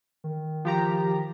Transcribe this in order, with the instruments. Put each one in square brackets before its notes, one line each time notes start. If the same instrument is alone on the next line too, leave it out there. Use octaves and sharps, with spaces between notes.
[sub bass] D#3
[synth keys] F3 G4 A#5